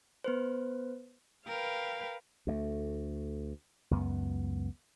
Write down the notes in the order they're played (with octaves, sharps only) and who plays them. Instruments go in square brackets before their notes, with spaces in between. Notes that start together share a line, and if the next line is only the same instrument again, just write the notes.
[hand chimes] B3 B4 C5
[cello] A#4 B4 [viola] F5 G5
[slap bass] D2 G#3 A3
C#2 F#2 B3